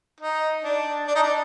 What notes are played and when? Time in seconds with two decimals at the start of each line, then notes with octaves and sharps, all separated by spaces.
0.21 D#4
0.64 D4
1.08 D4
1.15 D#4
1.23 D4